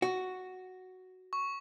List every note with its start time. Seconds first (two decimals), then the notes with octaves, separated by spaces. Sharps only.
0.02 F#4
1.33 C#6